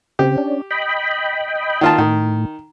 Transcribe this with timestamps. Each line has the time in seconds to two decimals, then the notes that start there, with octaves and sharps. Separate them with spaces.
0.19 C#3 C4 G4
0.38 C#4 D4
0.71 D#5 G5 B5
1.81 D#3 F4 A5
1.98 A2 D#3